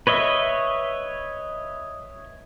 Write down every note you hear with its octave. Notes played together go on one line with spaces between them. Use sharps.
B4 C#5 D#5 E5